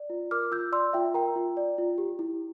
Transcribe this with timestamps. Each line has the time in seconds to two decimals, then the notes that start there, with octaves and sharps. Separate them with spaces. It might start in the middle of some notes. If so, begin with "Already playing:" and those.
Already playing: D5
0.10 F4
0.31 A#4 D6 F6
0.51 F4 E6 G6
0.72 D5 C6 E6
0.93 F4 E5 G5
1.14 A#4 G5 A#5
1.36 F4
1.57 D5
1.78 F4
1.98 G4
2.19 E4